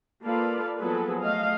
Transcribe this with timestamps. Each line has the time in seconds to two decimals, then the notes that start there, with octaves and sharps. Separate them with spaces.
0.23 A#3 F4 A4 B4 D5 F5
0.78 F3 F#3 B3 G#4 A4 B4
1.22 A3 D#5 F5